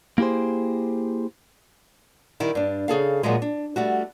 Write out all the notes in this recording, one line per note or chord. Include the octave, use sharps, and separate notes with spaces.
A#3 E4 G4 G#4 C5
D#3 G3 E4
G2 D4
C#3 G#4 A4 F5
A#2 F3 F#3 G#3
D4
G3 A3 F#4